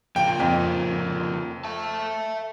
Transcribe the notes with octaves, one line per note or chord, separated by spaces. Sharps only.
C#3 F3 A#3 G5
F2
E5 A5